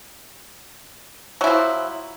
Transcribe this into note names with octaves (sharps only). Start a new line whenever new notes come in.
F3 F#3 E4